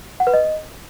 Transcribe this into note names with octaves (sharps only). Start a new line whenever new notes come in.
F#5
B4
D#5